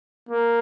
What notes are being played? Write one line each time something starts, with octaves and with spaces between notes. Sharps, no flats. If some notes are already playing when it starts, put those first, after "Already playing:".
A#3